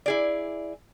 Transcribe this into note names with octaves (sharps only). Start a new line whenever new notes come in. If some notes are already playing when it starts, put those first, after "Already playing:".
E4 G#4 D5